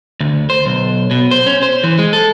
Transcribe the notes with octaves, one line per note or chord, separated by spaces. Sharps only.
D2
C5
B1
B2
C5
C#4
C5
E3
G#3
A4